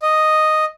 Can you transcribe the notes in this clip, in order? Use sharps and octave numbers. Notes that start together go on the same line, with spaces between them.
D#5